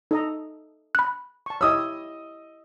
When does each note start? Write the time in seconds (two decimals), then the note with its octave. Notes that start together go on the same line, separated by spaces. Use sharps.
0.11 D#4 A4 D#5 A#5
0.95 B5 F#6
1.46 A5 C#6
1.61 E4 G4 C#5 D#5 D#6 E6